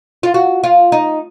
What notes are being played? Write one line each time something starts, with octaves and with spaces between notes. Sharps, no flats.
F4
F#4
F4
D#4